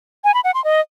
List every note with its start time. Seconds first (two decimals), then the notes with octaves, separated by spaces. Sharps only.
0.24 G#5
0.34 B5
0.44 F#5
0.54 C6
0.64 D#5